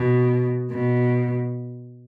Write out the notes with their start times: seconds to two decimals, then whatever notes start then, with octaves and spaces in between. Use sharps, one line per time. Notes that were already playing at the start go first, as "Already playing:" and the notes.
Already playing: B2
0.71 B2